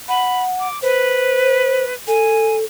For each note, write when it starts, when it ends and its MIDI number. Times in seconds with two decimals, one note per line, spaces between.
0.09 0.68 78
0.09 0.42 83
0.60 0.81 86
0.82 1.94 71
0.82 1.84 72
2.07 2.64 69
2.07 2.56 80